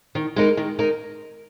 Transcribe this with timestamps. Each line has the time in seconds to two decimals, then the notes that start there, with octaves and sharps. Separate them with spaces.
0.15 D#3
0.36 G#3 D#4 A#4
0.57 D#3
0.79 G#3 D#4 A#4